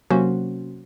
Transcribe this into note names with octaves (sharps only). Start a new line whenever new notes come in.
C3 F#3 A#3 C#4 F#4 C5